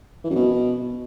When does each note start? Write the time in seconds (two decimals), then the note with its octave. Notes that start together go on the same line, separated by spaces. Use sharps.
0.24 E3
0.30 F#2
0.36 B2